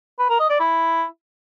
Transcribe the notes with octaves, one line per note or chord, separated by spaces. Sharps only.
B4
A#4
D#5
D5
E4